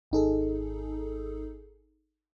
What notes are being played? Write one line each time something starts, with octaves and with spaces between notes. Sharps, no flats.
G#1 D#4 G#4 A4